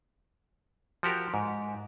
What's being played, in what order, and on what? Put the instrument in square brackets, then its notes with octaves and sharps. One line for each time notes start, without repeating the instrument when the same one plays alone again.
[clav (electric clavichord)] F3 F#4 G4 A#4
G#2